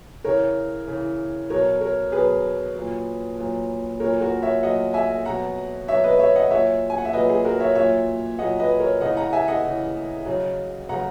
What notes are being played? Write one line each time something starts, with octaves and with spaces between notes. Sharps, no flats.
C#3 E3 A#4 C#5
C#3 E3
B2 F#3 A#4 C#5
A#4 C#5
B2 F#3 G#4 B4
A#2 F#3
A#2 F#3
A#2 F#3 A#4 C#5
F#4 A#4
C#5 E5
A#2 F#3 D#5 F#5
E5 G#5
B2 F#3 F#5 A#5
B2 F#3 C#5 E5
B4 D#5
C#5 E5
D#5 F#5
A#2 F#3 C#5 E5
G#5
F#5
E5
A#2 F#3 B4 D#5
G#4
F#4 A#4
C#5 E5
A#2 F#3 C#5 E5
A#2 F#3 D#5 F#5
B4 D#5
A#4 C#5
C#3 E3 D#5 F#5
F#5 A#5
E5 G#5
D#5 F#5
C#3 E3
C#3 F#3
C#3 F#3 F#5 A#5